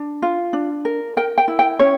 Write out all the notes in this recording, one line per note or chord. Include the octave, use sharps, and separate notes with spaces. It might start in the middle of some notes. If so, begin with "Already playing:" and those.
Already playing: D4
F4
D4
A#4
A#4 G5
G5
E4
G5
C#4 C#5